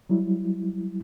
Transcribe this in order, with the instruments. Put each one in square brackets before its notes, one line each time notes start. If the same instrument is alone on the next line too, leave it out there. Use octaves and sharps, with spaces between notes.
[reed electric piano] F#3 G3 E4